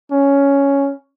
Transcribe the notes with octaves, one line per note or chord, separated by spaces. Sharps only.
C#4